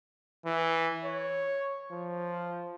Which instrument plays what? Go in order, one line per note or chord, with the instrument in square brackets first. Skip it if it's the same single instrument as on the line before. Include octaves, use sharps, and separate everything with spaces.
[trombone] E3
C#5
F3